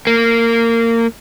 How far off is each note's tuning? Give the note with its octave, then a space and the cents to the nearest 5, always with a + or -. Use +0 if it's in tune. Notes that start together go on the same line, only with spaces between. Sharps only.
A#3 -20